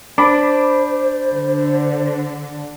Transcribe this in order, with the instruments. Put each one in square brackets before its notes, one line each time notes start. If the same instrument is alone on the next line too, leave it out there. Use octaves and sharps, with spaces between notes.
[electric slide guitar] D4 [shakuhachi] C5 [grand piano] B5 D6
[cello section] D3